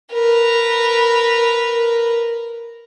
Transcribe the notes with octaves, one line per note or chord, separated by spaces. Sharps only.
A#4 B4